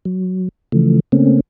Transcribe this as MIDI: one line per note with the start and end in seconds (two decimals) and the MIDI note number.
0.05 0.49 54
0.72 1.00 49
0.72 1.00 52
0.72 1.00 53
0.72 1.00 57
1.12 1.40 49
1.12 1.40 57
1.12 1.40 58
1.12 1.40 60
1.12 1.40 61